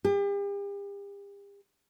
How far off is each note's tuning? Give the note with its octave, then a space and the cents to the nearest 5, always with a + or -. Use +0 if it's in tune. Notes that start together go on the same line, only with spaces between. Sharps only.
G4 +40